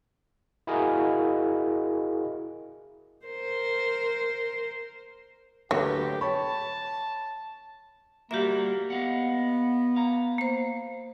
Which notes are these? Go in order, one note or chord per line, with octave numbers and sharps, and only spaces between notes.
E4 F#4 G#4 A#4 D#5 F5
A#4 C5
D2 F#3 A3 G4 B4
C#5 A5 B5 C#6
G3 A#3 F#4 G4 A#4 E5
B3 D#5 F5 F#5
F5 A#5
A#3 C5